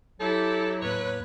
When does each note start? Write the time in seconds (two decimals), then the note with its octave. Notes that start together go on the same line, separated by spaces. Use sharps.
0.20 F#3 E4 G4 A4
0.82 E2 A2 A#3 B4 C#5